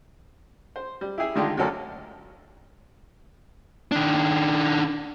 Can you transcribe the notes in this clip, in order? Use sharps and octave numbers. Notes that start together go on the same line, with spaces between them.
C5
G3
E4 G4 G#4 E5
D3 D#3 G#3 D4 F4 G4
D2 D3 F#3 C#4 A4 A#4
D#3 D4